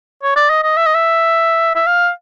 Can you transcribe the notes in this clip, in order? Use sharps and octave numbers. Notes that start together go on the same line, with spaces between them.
C#5
D5
D#5
D#5
E5
D#5
E5
E5
F5